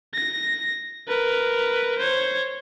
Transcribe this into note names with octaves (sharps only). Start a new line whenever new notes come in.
A#6
A#4 B4
C5 C#5